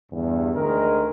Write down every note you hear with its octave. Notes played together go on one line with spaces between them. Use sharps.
E2 G2
D2 D#3 G#3 A#4